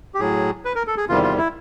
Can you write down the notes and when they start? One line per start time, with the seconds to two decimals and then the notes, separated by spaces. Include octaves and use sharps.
0.14 G4
0.19 A2 F#3 G#4
0.65 B4
0.75 A#4
0.87 A4
0.97 G#4
1.08 E2 C3 D#3 G3 F4
1.23 F4
1.38 E4